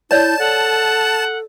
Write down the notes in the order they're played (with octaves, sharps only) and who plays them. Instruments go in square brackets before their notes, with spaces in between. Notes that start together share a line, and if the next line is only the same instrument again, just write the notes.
[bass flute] E4 [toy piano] C#5 D5 [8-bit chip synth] A5 [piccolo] G6
[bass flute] A4 [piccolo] F#5